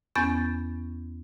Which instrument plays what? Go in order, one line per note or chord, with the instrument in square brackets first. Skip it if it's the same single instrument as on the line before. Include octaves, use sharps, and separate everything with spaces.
[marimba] E2 B3 C#4 G6 A6